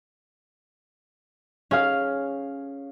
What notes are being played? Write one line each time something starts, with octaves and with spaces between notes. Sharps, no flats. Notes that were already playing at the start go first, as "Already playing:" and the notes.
C#4 G#4 F5